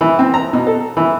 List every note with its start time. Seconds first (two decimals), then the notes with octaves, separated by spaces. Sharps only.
0.01 E3
0.19 C4
0.34 A#5
0.53 B2
0.67 A4
0.97 E3